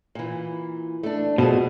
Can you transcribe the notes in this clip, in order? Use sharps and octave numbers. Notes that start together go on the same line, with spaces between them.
A#2 E3
A3 D4
B2 F3 A3 G#4